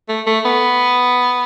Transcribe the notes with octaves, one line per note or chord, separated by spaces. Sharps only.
A3
A3
B3